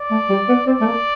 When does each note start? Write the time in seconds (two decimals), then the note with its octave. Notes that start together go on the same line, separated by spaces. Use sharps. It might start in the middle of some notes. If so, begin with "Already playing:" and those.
Already playing: D5
0.11 A3
0.29 G3
0.48 B3
0.67 C4 D5
0.81 A3
0.86 A#3